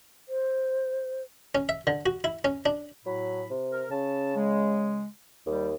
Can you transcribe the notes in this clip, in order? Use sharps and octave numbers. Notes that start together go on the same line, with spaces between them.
C5
C#4
E5
D3
F#4
E4
C#4
D4
A2 F#3 B5
C3
A#4
C#3 C#4 A5
G#3
D#2 G3